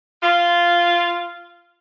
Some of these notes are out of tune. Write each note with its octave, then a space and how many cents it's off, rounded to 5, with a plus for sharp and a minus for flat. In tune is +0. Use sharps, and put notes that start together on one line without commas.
F4 -10